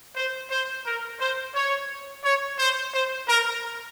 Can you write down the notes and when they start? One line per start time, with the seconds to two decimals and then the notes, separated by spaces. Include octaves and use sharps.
0.15 C5
0.50 C5
0.85 A#4
1.19 C5
1.53 C#5
2.23 C#5
2.58 C5
2.92 C5
3.27 A#4